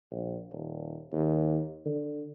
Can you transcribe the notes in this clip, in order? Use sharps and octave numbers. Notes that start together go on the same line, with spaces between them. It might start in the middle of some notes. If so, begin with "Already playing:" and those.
A#1
D#1
D#2
D3